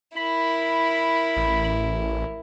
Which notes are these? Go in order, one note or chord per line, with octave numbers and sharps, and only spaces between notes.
E4 A#4 B5
A1